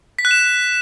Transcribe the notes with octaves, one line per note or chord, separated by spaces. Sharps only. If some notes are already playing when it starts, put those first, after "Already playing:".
B6
F#6
E7